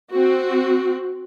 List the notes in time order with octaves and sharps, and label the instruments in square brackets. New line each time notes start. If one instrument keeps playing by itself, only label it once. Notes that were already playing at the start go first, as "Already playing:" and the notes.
[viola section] C4 F#4